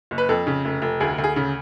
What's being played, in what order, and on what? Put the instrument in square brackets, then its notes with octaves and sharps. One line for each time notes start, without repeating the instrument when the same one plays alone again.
[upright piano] F#1
B4
F2 A4
C#3
F1
F1
D2 G#4
D2
G#4
C#3